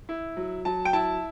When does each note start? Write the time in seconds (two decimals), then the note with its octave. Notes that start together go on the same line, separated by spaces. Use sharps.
0.09 E4
0.37 F#3
0.65 F#3 A5
0.85 G5
0.93 E4 A5